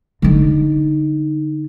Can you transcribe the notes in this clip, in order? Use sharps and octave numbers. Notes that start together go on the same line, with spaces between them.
D3 D#4